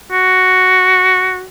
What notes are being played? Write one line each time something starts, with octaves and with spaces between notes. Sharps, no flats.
F#4